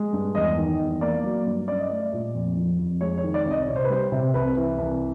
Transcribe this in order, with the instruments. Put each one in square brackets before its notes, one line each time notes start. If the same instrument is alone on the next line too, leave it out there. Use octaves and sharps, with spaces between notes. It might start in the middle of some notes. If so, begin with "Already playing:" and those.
Already playing: [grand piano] G#3
G2
E2 D#5
D#3
E2
A#3 D5
F#3
G2
C#4 D5
D#5
A3 D5
A#2
F2
F3
F2
G#3 C#5
C#5
D#3
D5
C2
D#5
C3 C#5
C5
B4
G3 C5
C3
C2 B4
E3
C2